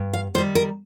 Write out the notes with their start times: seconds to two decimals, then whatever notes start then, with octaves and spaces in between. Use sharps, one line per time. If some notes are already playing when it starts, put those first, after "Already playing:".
Already playing: G2
0.13 F5
0.35 D#3 C5
0.38 G3
0.55 A#4